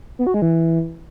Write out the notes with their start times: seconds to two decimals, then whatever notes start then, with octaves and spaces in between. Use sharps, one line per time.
0.19 B3
0.27 F#4
0.34 G#3
0.42 E3